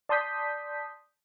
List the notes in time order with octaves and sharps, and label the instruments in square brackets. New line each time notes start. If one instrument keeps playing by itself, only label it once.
[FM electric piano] D5 A5 C6 D#6 G6 B6